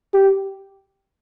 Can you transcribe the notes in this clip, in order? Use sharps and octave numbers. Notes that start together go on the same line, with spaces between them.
G4